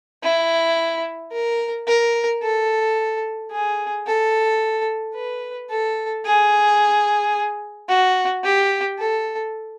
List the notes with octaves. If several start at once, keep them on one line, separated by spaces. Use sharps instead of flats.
E4
A#4
A#4
A4
G#4
A4
B4
A4
G#4
F#4
G4
A4